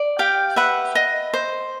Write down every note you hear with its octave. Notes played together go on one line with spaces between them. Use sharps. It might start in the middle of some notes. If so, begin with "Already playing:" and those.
Already playing: D5
G4 F5 G5
B4 E5 F#5
D#5
C5